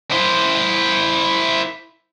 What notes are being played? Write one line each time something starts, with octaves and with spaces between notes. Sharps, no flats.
E4 C5